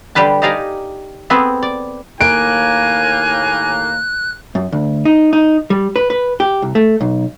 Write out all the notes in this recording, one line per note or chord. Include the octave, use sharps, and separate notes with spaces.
D3 G3 G4 B4 A5
D#4 G4 D5 F5 G#5 A#5
B3 C4 G#4 A4 B4
D5
D#2 A2 A#3 G#5 F#6 D7
F#2
D2
D#4
D#4
G3
B4
B4
G4
C2
A3
B1